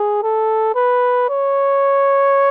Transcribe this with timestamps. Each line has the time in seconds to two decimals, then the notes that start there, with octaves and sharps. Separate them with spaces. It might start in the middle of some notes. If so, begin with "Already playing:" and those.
Already playing: G#4
0.23 A4
0.75 B4
1.29 C#5